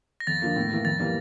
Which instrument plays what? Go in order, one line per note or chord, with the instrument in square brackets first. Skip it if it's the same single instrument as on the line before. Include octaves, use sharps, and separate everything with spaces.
[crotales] A#6
[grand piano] F2 [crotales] A6
[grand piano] D3 F3 A#3
A2
E3 A#3 E4
[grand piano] F2 [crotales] A6
[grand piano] E3 G3 A#3